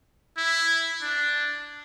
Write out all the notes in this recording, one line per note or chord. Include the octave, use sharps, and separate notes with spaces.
E4
D4